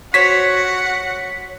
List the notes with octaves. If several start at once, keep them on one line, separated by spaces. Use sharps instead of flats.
F#4 C5 C#5 F#5 B6